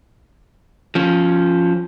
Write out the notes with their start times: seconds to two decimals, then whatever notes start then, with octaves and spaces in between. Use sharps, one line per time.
0.95 F3 C#4